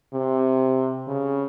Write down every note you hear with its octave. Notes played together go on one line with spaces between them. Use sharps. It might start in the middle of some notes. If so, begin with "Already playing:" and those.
C3
C#3